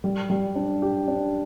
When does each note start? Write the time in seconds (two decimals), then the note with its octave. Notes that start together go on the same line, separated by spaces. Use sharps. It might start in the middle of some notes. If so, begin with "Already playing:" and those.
0.04 G3
0.30 G3
0.55 D4
0.82 G4
1.08 D4